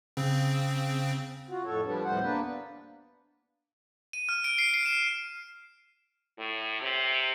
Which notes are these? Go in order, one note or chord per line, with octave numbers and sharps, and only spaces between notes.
C#3 C4
F4 F#4
F2 A2 A4 C#5
F3 G3 B3 D4
D#2 A2 C3 G3 C5 F#5
A#3 B3 D4 B4
D#7
F6
D7
C7
C7
E7
A2
C3